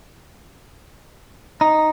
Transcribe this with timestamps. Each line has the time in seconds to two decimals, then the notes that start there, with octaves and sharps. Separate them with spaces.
1.61 D#4